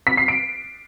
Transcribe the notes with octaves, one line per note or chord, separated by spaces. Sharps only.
B6
C7
D7